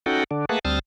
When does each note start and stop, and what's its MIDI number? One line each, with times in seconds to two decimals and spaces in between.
0.06 0.24 61
0.06 0.24 63
0.06 0.24 66
0.06 0.24 69
0.06 0.24 78
0.06 0.24 79
0.31 0.45 50
0.31 0.45 62
0.49 0.59 57
0.49 0.59 58
0.49 0.59 68
0.49 0.59 71
0.49 0.59 78
0.49 0.59 81
0.65 0.79 38
0.65 0.79 55
0.65 0.79 60
0.65 0.79 81
0.65 0.79 87
0.65 0.79 89